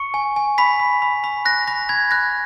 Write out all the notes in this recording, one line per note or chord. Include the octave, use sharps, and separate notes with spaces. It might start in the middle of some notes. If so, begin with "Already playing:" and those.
Already playing: C#6 C#7
G#5
G#5
B5 B6
B5
B5
B5
F#6 A#6
B5 A#6
B5 G#6
F#6 A#6